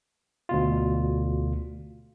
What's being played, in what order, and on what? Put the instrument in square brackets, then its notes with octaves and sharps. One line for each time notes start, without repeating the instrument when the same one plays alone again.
[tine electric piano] D2 B2 F4